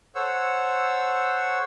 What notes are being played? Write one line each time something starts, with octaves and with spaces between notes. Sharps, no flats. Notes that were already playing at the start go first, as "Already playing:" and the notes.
A4 C5 C#5 F#5 E6